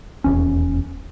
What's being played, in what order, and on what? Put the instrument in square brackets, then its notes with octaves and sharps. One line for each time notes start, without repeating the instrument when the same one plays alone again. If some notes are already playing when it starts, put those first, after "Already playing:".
[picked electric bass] D#1 E2 C#4